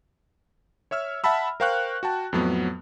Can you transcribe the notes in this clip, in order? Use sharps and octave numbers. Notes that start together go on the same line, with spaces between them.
C#5 E5 E6 F6
E5 F#5 A5 B5 E6
A#4 C5 F5 G5 C#6 F#6
F#4 G5 A5
F2 A2 F#3 B3